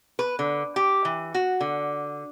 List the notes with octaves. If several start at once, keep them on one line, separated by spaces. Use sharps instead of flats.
B4
D3
G4
E3
F#4
D3